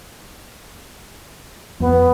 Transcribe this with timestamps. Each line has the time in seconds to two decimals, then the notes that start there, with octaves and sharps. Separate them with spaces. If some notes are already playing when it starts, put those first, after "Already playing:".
1.80 F2 B3